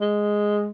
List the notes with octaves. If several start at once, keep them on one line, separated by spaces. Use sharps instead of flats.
G#3